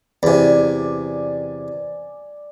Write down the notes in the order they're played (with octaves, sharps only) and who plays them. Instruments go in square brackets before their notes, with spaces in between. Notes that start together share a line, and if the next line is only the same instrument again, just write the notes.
[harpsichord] E2 C3 [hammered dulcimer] D5 G#5